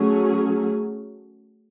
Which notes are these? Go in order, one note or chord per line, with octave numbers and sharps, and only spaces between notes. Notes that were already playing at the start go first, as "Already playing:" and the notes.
Already playing: F#3 A3 C#4 G#4